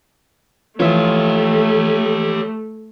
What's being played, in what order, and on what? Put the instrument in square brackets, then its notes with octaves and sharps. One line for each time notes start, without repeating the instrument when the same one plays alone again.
[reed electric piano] E3 F3 E5 [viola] A3 [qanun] F4 [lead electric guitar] G4 C#5